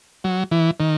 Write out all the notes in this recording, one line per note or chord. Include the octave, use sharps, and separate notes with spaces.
F#3
E3
D#3